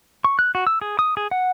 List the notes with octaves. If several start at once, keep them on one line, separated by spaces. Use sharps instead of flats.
C#6
F#6
F#4
E6
G#4
D#6
G#4
F#5